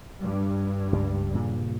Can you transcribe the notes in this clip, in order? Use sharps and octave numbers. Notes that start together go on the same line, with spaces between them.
G2
C#2 G3
A#2 C#3